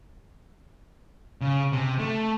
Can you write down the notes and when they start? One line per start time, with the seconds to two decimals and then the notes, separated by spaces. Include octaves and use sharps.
1.41 C#3
1.72 C3
1.99 A3